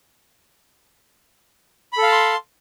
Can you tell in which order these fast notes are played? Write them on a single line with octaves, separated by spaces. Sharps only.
B5 A4 F5 A5 C6